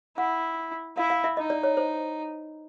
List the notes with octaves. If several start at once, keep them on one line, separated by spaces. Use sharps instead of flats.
E4 F#5
E4 F5
F5
E5
D#4 D#5
D5
C#5
C5